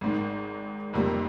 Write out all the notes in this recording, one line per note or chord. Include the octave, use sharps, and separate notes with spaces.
G#1 G#2 D#3
F1 F2 C3 G3 A#3